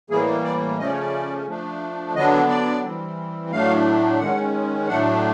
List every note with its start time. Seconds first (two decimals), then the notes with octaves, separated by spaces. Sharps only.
0.10 A2 E3 G3 A#3 G#4
0.44 D5
0.78 C#3 F3 A3 C#4 D#5
0.86 D5
0.92 C#5
0.99 D5
1.47 F3 A3 D4
2.15 D3 F#3 B3 D4 D#5
2.49 D5
2.83 E3 G3 C4
3.51 A2 F#3 A3 D4 F5
4.19 D#3 G#3 C#4 F#5
4.88 A2 F#3 A3 D4 F#5